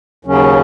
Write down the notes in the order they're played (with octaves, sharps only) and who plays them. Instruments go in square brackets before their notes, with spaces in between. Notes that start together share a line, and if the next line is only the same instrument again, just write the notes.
[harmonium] D#2 C#3 F#3 C#4